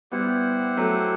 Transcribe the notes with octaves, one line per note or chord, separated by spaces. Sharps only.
G3 B3 E4 G4 C5 F#5
F#3 A3